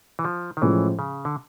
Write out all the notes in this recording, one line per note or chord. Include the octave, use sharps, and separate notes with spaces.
E3
F3
D#3
A2 E3 F3 G#3 C#4
C#3
D3